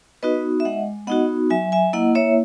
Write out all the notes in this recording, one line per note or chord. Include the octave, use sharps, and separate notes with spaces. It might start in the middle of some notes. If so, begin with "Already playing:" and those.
B3 D#4 F#4 B4 D#5
E5
G#3 D#5 F#5
B3 D#4 F#4 D#5 F#5
F#3 E5 G#5
E5 G#5
A#3 E4 D#5 F#5
C#5 E5